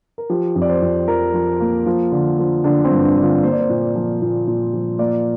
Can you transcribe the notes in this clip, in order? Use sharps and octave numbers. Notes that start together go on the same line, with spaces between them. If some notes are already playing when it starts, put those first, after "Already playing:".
A#4
F3 G4
F2
D5
C5
F2
F3 A#4
F3
A#3
F3 F4
D3
F3
D3 D4
C4
G2
D4
D3
F4
A#3 C5
D5
C5
A#2
F3
A#2
A#2
F3
A#3 D5